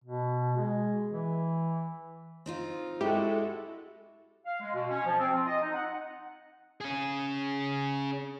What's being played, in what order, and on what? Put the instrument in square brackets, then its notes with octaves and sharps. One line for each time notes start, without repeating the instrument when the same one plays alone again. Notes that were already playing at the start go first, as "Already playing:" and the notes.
[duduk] B2
G#3
E3
[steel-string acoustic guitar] C4 D#4 F4
[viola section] G#3 F#4 A4 [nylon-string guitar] E4 [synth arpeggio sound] G4
[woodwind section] F5
G#3
B2
C#4
F3
C4
F4
D#5
D#4
F#5
[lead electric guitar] C#4 G#4